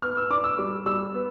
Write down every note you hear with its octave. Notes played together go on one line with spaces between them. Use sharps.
B3 F6
E6
D4 D6
E6
G3 D6
G3 E6
B3